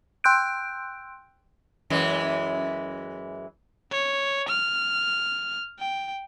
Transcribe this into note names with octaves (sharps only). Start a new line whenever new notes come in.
G5 C6 E6 F#6 G6 D7
F#2 E3 G#3
C#5
F6
G5